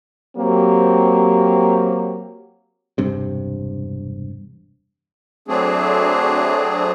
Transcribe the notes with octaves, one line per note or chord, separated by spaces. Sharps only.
F#3 A#3 C4 G4
E1 G2 C3
F#3 A3 C4 D4 G#4